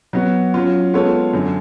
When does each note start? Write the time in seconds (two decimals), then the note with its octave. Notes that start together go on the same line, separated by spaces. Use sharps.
0.13 F#3 B3 F#4
0.54 F#3 C#4 F4
0.93 G#3 B3 F4 A4 C#5
1.33 F#2 D3 F#3